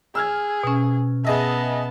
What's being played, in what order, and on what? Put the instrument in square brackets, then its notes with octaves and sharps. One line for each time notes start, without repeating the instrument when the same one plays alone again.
[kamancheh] G#4 [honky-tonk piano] E6 F6 G#6
[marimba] B2 C#4
[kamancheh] B3 A5 [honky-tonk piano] G#4 D#5 E5